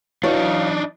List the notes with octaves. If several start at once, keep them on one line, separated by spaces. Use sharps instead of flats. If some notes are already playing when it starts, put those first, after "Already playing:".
E3 F#3 D4 D#4 C#5 F5